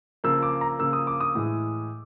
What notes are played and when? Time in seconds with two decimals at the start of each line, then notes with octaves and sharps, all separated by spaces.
0.24 C#3 F3 A#3 E6
0.43 D6
0.61 A#5
0.79 C#3 F3 A#3 E6
0.93 D#6
1.07 D6
1.21 D#6
1.35 A2 E3 G#3